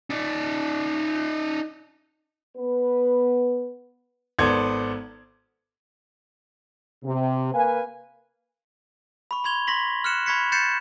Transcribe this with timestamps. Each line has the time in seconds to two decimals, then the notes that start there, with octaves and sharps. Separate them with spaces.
0.10 D#4 D5
2.57 B3 B4
4.39 G#1 B3 A4 C5 D5 G#6
7.04 C3
7.53 A#3 B4 F5 G#5
9.31 B5 C#6
9.44 B5 C6 G#6 F7 G7
9.67 C6 C#6 A#6 B6 F#7
10.04 F6 F#6 C#7 E7
10.26 B5 C#6 G#6 B6 C#7
10.52 G6 A6 C7 C#7 E7